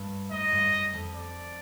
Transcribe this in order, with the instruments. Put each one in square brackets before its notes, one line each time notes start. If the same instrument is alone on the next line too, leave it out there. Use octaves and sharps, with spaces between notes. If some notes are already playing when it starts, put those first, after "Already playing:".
Already playing: [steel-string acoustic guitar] G2
[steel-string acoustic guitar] G#2 [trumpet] D#5
[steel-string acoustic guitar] G2
F#2
F2
[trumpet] D5